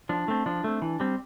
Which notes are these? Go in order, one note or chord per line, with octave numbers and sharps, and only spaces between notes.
F3 D4
A3 C4
F3 D4
A3 C4
E3
G3 C4